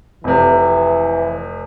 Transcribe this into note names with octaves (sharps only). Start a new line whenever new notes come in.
F1 C3 E3